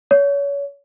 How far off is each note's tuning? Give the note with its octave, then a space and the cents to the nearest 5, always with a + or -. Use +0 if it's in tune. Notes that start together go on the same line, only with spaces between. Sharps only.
C#5 +30